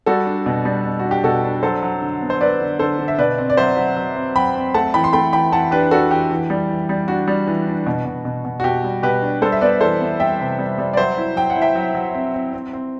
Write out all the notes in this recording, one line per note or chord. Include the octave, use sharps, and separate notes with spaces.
G3 F#4 A4
D4
B2
G3
B2
D4 F#4
G4
B2 F#4 A4
D4
F#3 A4 C5
F#3
D3
B3
C5
F#3 B4 D5
D3
D3 A4 C5
D3
E5
B2 B4 D5
C4
D5
F#3 C5 E5
F#3
F#3
C4
F#3 G5 B5
C4
A3 F#5 A5
E3 G5 B5
C6
A3 G5 B5
E3 G5 B5
E3 F#5 A5
D4 G4 B4
D4 F#4 A4
E3 G4
E3
G3
E3
G3
D4 F#4
G3
E3
D4
B2
B2
B2
B2
F#4
B2 G4
G3
B2 G4 B4
D4
G3 A4 C5
E5
B3 B4 D5
E3 A4 C5
B3
G3 E5 G5
C3
G3
G3
D5
F#3 C5 E5
E4
F#3 G5
F#5
E4
E5 G5
F#3
F#3
C4
C4
C4
C4